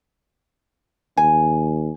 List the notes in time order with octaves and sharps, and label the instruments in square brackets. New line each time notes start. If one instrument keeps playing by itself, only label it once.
[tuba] D#2 [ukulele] G#5